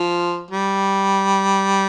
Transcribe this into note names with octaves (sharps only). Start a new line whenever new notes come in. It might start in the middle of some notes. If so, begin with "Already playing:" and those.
Already playing: F3
G3